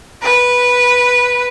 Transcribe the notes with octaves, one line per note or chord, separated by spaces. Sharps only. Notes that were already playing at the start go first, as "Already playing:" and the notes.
B4